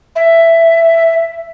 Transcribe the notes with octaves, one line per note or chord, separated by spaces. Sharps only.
E5